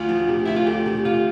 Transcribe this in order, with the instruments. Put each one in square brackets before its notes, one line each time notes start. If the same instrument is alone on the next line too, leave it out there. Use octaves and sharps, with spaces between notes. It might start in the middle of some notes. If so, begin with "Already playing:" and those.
Already playing: [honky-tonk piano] D2 [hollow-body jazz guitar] F4
[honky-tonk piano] F3
C3
[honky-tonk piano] D2 [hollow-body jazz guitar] E4
[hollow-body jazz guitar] F4
[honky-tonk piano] A3 [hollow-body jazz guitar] G4
[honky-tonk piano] C3
[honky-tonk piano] C3 [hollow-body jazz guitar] F4